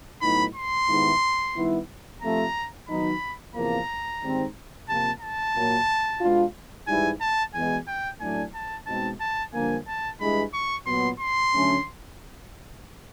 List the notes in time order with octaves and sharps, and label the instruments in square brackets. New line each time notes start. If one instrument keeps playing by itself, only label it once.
[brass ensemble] A2 F#3 B3 D#4 [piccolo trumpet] B5
[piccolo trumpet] C6
[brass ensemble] G#2 D#3 G3 B3 E4
D#3 G3 B3 E4
[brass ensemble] C3 F3 A3 [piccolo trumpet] A#5
[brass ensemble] D#3 F#3 B3 D#4 [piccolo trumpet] B5
[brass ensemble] E2 C3 F3 A#3 [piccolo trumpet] A#5
[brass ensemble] G#2 D#3 G3 C4
[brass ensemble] C3 F3 A#3 [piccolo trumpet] A5
[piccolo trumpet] A5
[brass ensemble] A#2 F#3 A#3
B2 G#3 B3 D4 F4
[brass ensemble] G#2 E3 G3 [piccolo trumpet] G#5
[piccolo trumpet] A5
[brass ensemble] E2 B2 G#3 [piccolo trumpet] G#5
[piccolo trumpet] G5
[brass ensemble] A2 F#3 A3 D4 [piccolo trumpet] G#5
[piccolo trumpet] A5
[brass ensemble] B2 G#3 C4 D#4 [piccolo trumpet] A5
[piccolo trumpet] A5
[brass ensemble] G2 D3 F3 A#3 [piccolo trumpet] G#5
[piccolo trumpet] A5
[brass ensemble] G2 E3 G#3 [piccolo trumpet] B5
[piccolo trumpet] C#6
[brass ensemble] A#2 F#3 B3 [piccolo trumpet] C6
[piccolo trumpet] C6
[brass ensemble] D3 F#3 A3 C#4